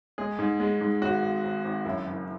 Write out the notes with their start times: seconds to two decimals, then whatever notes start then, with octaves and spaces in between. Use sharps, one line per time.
0.18 G#3 G#4
0.39 G#2
0.60 G#3
0.81 G#2
1.02 G#1 F#4
1.22 G#1
1.44 G#1
1.65 G#1
1.85 F#2 E4
2.07 F#1